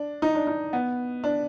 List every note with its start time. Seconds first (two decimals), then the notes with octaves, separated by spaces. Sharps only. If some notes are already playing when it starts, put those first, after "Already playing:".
Already playing: D4
0.22 D#4
0.35 D4
0.47 D#4
0.73 B3
1.24 D4